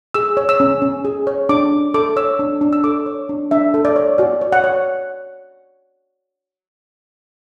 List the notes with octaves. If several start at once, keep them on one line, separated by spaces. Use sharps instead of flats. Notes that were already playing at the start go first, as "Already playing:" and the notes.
G#4 E6
C#5
E6
C#4
C#4
G#4
C#5
D4 D6
D4
A4 D6
C#5 E6
D4
D4
E6
A4 D6
C#5
D4
D4 E5
A4
D5
C#5
F#4 D5
C#5
F#5
C#5